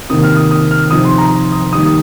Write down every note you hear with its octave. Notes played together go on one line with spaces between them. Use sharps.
C3 D#3 A#3 D#6
F6
D#6
D#6
F6
C3 F3 D#4 D#6
C6
A#5
D#6
D#3 G3 A#3 D#4 D#6
D#6